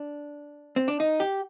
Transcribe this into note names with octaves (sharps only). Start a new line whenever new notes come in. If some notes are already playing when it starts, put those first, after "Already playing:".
Already playing: D4
C4
D4
D#4
G4